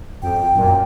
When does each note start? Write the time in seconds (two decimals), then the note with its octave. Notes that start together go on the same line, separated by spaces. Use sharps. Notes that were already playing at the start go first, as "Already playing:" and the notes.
0.23 F2 G5
0.55 F#2 A#2